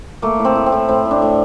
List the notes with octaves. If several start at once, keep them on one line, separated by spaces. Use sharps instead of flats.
A3 A#3
A2
C4
A2
C4
A2
A2 C4
A2
D4
A2